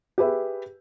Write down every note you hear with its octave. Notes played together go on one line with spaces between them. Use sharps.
G4 G#4 B4 E5